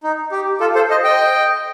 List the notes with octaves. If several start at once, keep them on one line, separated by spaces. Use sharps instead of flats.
D#4
G4
F4 A4
A4 C5
C5 D#5
D#5 G5